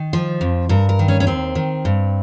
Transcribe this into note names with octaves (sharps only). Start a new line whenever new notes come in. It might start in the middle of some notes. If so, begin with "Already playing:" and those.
Already playing: D#3
F3
F2
G2 A#4
A#4
D#3
C#4
C#4
D#2 C4
D#3
G2